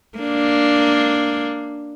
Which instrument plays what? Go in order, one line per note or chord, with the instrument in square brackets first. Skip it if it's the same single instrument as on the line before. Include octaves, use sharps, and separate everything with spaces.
[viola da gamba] A#3 D4